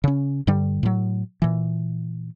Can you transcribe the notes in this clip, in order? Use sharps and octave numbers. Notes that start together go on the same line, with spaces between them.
C#3 C#4
G2 D3 G3
A2 F#3
A#2 E3